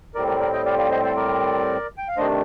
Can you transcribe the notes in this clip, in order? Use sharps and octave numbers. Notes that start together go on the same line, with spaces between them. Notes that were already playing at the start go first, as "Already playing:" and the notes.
A2 G3 C4 A#4 D5
A#4 D5
A#4 D5
D#5 G5
D5 F5
D5 F5
C5 D#5
A4 C5
A#4 D5
G5
F5
C3 D#3 A3 D4 C5 D#5